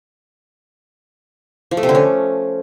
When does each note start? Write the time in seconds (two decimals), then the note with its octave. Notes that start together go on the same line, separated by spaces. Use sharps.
1.71 F3
1.77 A3
1.83 C3
1.89 D3
1.95 C#4